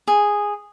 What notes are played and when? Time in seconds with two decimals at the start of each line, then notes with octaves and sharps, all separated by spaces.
0.08 G#4